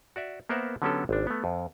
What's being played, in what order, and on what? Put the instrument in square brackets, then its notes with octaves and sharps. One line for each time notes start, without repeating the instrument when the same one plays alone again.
[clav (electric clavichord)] F#4 D5 E5
A#3 B3 A#4 C5 E5 F#5
D3 F#3 B3 C#4 G4 A4
G#1 D4
A3 B3
F2